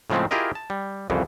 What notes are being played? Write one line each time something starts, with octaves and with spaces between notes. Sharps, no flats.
A2 C#3 F3 G#3 A3 C4
E4 F4 G4 G#4 A#4 D#5
A5
G3
C2 F2 C#3 E3